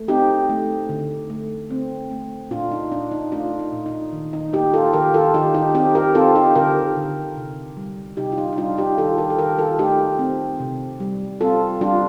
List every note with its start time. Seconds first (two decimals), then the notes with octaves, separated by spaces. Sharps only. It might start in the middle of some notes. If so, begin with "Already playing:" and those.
Already playing: A3
0.08 C4 D#4 G4
0.49 A3
0.89 D3
1.30 A3
1.71 C4
2.11 A3
2.51 A#2 D4 F4
2.71 D#4
2.91 A#2 D4
3.11 D#4
3.32 A3 D4 F4
3.59 D#4
3.72 A#2
3.86 D#4
4.13 D#3
4.33 D#4
4.53 A#3 D#4 G4
4.73 F4 A4
4.93 D#3 G4 A#4
5.14 F4 A4
5.34 D#3 D#4 G4
5.54 D#4 G4
5.75 C4 D#4 G4
5.95 G4 A#4
6.15 C4 F4 A4
6.35 D#4 G4
6.55 D3 G4 A#4
6.96 D3
7.37 C3
7.77 G3
8.17 C3 D#4 G4
8.32 F4
8.38 D#4
8.53 D#4
8.58 G3 D4 F4
8.78 D#4 G4
8.98 D#3 F4 A4
9.18 G4 A#4
9.30 A4
9.38 D#3 G4 A#4
9.58 F4 A4
9.79 A3 D#4 G4
10.19 C4
10.60 C3
11.00 G3
11.41 C4 F4 A4
11.81 G3 D4 F4